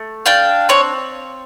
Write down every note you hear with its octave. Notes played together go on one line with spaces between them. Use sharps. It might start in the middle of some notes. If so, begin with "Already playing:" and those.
Already playing: A3
D4 F5 G5
C4 C#5